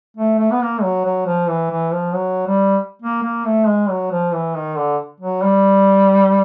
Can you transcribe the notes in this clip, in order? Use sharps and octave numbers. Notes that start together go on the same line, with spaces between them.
A3
A3
B3
A#3
F#3
F#3
F3
E3
E3
F3
F#3
G3
A#3
A#3
A3
G#3
F#3
F3
E3
D#3
D3
F#3
G3